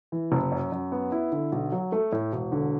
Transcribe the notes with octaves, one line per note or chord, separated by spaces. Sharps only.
E3
F#1
F#2
F#2
B3
E4
D3
B1
F#3
A3
A2
E1
D3